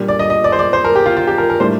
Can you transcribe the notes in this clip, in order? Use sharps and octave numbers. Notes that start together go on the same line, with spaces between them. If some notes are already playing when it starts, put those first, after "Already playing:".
Already playing: A#2 G3 D4
D5
D#5
D#5
D5
C5
D5
C5
A#4
G4
F4
F4
G4
A#4
A#4
A2 G3 A#3 D4 C5